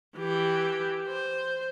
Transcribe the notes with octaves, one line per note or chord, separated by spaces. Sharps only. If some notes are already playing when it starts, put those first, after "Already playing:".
E3 G4
C5